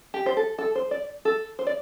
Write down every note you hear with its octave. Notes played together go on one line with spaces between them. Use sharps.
G4
C5
A4
A4
C5
D5
A4
C5
D5